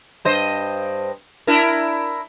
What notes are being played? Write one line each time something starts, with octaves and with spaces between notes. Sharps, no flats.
G2 C5 D#5
D4 E4 A#4